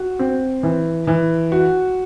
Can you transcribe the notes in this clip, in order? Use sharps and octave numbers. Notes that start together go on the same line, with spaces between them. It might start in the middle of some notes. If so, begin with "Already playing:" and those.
Already playing: F#4
C4
E3
E3
F#4